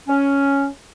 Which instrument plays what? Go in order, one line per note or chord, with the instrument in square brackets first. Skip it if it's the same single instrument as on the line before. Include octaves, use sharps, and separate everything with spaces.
[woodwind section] C#4